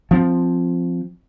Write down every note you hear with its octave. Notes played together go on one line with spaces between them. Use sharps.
F3 C4